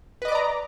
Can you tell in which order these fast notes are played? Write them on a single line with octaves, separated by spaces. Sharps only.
B4 D#5 D6 D5 A#5